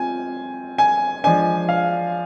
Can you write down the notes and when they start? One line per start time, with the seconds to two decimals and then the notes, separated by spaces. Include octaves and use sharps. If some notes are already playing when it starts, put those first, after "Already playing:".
Already playing: C4 F4 G#5
0.78 G#5
1.24 F3 G#3 D4 G#5
1.69 F5